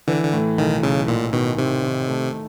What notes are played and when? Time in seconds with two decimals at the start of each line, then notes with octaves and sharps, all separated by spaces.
0.08 D3 E3
0.24 D3
0.32 A2
0.58 B1 D#3
0.83 B1 C#3
1.08 A1 A#2
1.33 B2 D#3
1.58 C3 D#3
1.83 D#3
2.08 A3